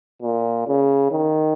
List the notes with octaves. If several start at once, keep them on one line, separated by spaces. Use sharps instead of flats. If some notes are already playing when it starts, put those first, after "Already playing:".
A#2
C#3
D#3